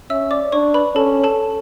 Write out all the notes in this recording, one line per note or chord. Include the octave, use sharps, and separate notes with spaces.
C#4 E5 E6
D5 D6
D4 C#5 C#6
B4 B5
C#4 A4 A5
A4 A5